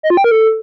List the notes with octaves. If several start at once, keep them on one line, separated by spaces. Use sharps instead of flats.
D#5
F4
G5
A#4
A4